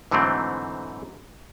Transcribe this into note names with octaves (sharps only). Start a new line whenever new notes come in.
G#2 D3 E3 F#3 A3 C4